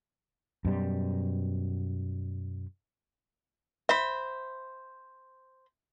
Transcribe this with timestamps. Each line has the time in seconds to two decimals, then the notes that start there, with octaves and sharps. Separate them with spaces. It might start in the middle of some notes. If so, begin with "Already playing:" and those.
0.65 F#2 B2 G3
3.89 C5 E5 B5